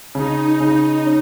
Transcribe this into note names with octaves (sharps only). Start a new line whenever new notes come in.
C#3 D#4
C#3
C#4